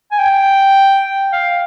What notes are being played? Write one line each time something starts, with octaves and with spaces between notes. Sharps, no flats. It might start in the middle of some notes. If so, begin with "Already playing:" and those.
G#5
G5
F5